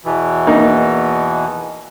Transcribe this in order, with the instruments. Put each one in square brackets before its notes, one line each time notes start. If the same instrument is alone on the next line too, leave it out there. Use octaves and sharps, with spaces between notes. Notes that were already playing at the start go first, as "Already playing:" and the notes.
[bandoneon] E2 B2 E3
[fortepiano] A#3 D#4